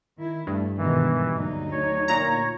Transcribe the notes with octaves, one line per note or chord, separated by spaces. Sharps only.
D#3 E4
G2 A3
G#2 B2 D#3 E3
D2 F#3 D#4
C#5
A#2 A#5